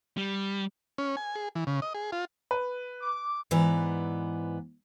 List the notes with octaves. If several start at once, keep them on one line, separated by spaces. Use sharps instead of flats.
G3
C#4
G#5
G#4
E3
C#3
D#5
G#4
F4
B4
D6
G#2 E3 B3 D5 A#5